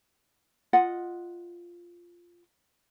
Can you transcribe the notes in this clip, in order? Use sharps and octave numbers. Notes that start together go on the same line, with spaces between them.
F4 D#5 F#5